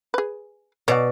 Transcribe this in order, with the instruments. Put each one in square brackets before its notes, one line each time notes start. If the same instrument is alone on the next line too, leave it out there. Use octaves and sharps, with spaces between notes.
[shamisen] G#4 B4
[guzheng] B2 D5 [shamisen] C#5 F#5